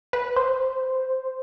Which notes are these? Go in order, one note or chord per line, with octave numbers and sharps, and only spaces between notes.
B4
C5